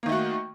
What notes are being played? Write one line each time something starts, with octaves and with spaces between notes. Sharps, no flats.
D#3 A3 A#3 F#4